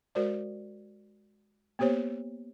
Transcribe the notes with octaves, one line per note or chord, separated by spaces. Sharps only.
G#3 F#4 A#4 C5 D5
A#3 B3 G4 C5 C#5